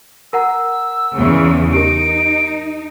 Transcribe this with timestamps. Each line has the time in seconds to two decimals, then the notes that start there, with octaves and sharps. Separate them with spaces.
0.33 A#4 F#5 A#5 E6
1.14 E2 C#3
1.73 D#4 G4 A#4 D7